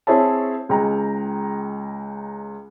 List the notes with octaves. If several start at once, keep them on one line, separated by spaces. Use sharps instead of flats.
C4 E4 G#4 C#5 E5 A5
C#2 G#3 G5 A#5